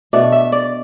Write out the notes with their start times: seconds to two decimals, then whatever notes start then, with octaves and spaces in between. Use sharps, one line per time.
0.13 B2 A3 D4 D5
0.32 E5
0.52 D5